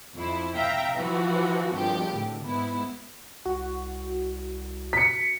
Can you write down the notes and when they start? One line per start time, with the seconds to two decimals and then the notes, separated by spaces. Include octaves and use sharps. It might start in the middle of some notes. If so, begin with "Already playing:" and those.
0.15 F2 E4
0.56 E5 F5 G5 A#5
0.98 E3 F3 F#4
1.73 G#1 G2 F3 G4
2.13 A2 D3
2.46 G#2 B3 E4
3.45 C2 F#4
4.93 B6 C#7